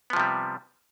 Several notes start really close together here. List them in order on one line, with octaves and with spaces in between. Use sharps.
B3 F3 C3 G3